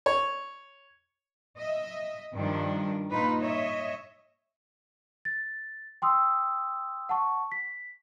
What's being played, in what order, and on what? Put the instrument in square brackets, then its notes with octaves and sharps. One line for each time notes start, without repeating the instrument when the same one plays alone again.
[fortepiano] C#5
[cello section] D#5 E5
G2 D#3 F3 D4
A#2 D#4 F4 B4
C#5 D#5 E5
[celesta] A6
G5 C6 D#6 E6
F#5 A5 C#6
B6